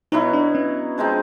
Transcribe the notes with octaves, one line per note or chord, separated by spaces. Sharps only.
B2 F#3 B3 D#4 E4
D4
C#4
F3 G#3 C4 D#4